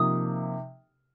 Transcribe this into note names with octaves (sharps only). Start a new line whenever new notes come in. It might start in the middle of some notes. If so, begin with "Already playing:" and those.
Already playing: C3 F3 A#3 D#4 D#6